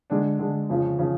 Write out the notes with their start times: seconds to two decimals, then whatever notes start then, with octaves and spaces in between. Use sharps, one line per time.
0.10 D3 G#3 D4
0.39 D3 G#3 D4
0.69 F2 C#3 F3
0.99 C#3 F3